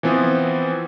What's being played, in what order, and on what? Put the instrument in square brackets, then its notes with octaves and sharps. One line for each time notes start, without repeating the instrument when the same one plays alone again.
[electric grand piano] E3 F3 B3 C4